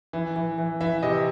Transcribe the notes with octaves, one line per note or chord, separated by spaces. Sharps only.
E3
E3
E3
E3 E5
C3 D#5